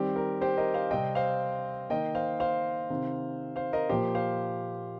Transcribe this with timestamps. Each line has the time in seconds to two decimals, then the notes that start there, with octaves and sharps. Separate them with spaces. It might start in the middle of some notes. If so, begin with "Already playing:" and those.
Already playing: D#3 G3 C4 G4
0.16 A#4
0.41 G4 C5
0.57 A#4 D#5
0.74 C5 F5
0.91 C3 G3 C4 D#5 G5
1.15 C5 F5
1.90 D#3 A#3 D#5 G5
2.15 C5 F5
2.40 C5 F5
2.90 C3 D#3 C4
3.56 C5 F5
3.73 A#4 D#5
3.89 A#2 F3 A#3 G4 C5
4.15 C5 F5